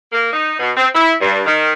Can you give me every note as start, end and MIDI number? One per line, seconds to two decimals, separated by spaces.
0.12 0.31 58
0.33 0.53 63
0.59 0.71 47
0.76 0.88 60
0.95 1.13 64
1.21 1.40 43
1.45 1.73 51